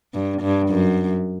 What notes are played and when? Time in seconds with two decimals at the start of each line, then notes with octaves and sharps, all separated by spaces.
0.14 G2
0.42 G2
0.69 F#2